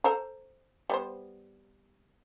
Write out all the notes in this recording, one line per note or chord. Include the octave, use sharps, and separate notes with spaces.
A4 C5 A#5
G3 B3 C5